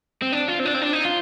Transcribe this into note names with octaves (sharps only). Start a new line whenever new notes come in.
C4
D4
F4
C4
D4
C4
D4
D#4
F4